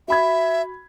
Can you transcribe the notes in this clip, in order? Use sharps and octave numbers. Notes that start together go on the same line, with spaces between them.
F#4 E5 B5 G#6